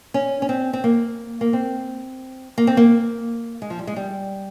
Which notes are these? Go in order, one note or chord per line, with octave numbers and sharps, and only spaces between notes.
C#4
C#4
C4
C4
A#3
A#3
C4
A#3
C4
A#3
G#3
F3
G3
G#3
G3